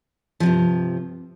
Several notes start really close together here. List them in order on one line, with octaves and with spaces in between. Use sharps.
F3 C3 G2